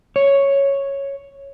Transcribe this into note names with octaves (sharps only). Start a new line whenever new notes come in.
C#5